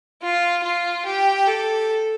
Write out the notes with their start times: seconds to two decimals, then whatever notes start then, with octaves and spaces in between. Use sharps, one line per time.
0.22 F4
0.63 F4
1.05 G4
1.47 A4